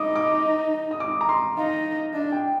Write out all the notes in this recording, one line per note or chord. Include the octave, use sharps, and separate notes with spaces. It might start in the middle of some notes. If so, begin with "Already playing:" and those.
Already playing: D#4 D6 D#6
D6
D#6
D6
A#5
C6
D#4 F5
D4 D#5
G5